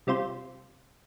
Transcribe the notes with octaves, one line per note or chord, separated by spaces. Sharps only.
C3 G3 C4 F4 C5